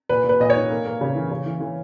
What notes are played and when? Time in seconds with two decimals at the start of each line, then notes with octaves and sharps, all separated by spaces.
0.09 A#2 B4
0.24 A#2
0.29 B4
0.40 A#2 D#5
0.50 C#5
0.55 D#4
0.70 A#3
0.85 A#3
1.01 C#3
1.15 E3
1.31 C#3
1.46 E3
1.60 E3